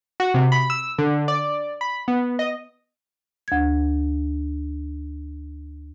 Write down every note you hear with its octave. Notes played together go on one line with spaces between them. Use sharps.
F#4
C3
B5
E6
D3
D5
B5
B3
D#5
D2 G#6